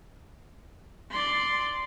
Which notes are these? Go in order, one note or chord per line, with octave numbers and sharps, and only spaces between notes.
D5 C6